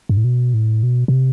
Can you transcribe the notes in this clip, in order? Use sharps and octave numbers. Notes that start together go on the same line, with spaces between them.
G2
A2
B2
A2
B2
B2
C3